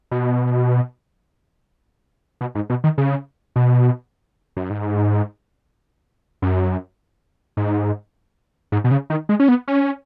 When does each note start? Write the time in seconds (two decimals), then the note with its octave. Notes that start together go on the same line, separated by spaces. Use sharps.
0.11 B2
2.41 B2
2.55 G#2
2.70 B2
2.84 D#3
2.98 C#3
3.56 B2
4.57 F#2
4.70 G#2
6.42 F#2
7.57 G#2
8.72 G#2
8.84 B2
8.91 C#3
9.10 D#3
9.29 G#3
9.40 C#4
9.48 B3
9.68 C#4